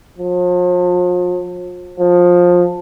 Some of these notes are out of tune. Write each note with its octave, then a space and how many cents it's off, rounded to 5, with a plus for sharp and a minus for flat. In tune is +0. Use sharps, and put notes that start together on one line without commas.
F3 +40
F3 +20